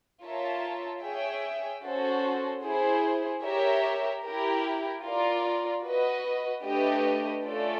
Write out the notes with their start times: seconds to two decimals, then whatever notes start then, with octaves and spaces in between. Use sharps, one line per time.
0.24 F4 A#4 C#5 E5 A5
1.04 G#4 C#5 E5 G5
1.85 C#4 F#4 A4 C5
2.64 E4 G#4 C5
3.44 G4 A#4 C#5 E5
4.24 E4 G4 A#4
5.05 F4 A#4 D5
5.85 F#4 B4 D#5
6.65 A3 D4 G4 B4 D#5
7.45 A3 C#4 F4 A4 D5